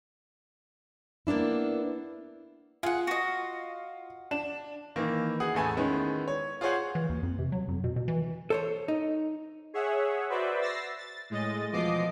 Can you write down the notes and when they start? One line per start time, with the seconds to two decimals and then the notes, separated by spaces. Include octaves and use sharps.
1.27 A#3 B3 D4 E4
2.83 F4 G#4 F#5
3.07 F#4 D#5
4.31 D4 E7
4.96 D#3 E3 A#3
5.40 G#4 F#5 D#6
5.54 A1 E2 A3 G#5 B5
5.77 D#3 G#3 B3 C#4 E4
6.28 C#5
6.61 F4 G#4 C5 C#5 F5 F#5
6.95 E3
7.09 D#2
7.23 F2
7.38 C3
7.52 F#3
7.68 F2
7.84 B2
7.96 B2
8.08 E3
8.50 A4 C5 C#5
8.88 D#4
9.74 G#4 C#5 E5 F#5
10.29 F#4 B4 C5 D5 E5
10.61 E6 A6 A#6 C7
10.98 A6
11.30 A2 G#3 D#5 A6
11.72 E2 B2 F3 D#5 D6 C7